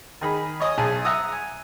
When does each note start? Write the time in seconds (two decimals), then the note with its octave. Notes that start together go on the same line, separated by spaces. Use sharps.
0.21 D#3 G#4 B5
0.60 C#5 D#5 G#5 D#6
0.78 B1 G#4 G#5 A5
1.04 E5 F#5 A#5 D#6 E6
1.32 G#5